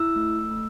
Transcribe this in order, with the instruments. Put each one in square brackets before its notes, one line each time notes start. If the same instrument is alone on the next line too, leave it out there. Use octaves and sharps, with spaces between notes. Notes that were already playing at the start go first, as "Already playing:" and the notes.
Already playing: [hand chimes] E4 E6
A3
A3